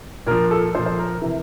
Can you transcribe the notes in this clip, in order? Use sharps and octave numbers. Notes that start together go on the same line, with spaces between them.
A#2 F3 A#4
A4
A#2 F3 C5
C5
A#4
C3 E3